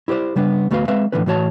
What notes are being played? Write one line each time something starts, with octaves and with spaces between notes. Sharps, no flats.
E4 G4 B4 C5 D5
C#3 G3 B3 D4
D2 A3 B3 F#4 B4 F5
G#3 C4 B4 E5 F5
A2 D3 E3 F3 C#4 B4
A2 E3 F#4 C#5 A5